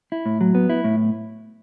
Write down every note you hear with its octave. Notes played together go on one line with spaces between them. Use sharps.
E4
A2
F#3
B3
E4
A2